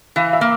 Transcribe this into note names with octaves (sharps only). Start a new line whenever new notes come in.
E3 F5
E5
A#3